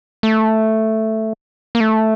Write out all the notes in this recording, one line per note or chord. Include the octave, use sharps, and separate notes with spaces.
A3
A#3
A3